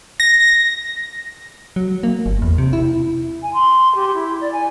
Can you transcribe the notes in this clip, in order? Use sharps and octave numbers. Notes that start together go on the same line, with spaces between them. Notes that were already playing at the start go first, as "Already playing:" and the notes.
A#6
F#3
A#3
G1
E2
C3
E4
G#5
C6
G4
E4
D5
G#5